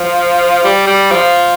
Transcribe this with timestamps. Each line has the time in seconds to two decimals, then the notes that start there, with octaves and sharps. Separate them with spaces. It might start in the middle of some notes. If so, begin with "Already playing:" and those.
Already playing: F3
0.64 G3
0.87 G3
1.11 F3